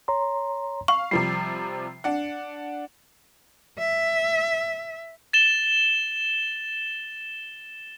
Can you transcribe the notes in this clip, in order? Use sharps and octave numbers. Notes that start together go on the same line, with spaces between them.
C#5 A#5 C6
F5 C#6
C3 F3 G3 C7
D4 F#5
E5
A6 E7 G7